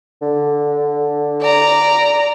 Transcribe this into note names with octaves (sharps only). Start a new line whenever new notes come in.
D3
D5 A#5